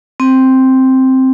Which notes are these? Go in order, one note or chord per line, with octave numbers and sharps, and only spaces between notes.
C4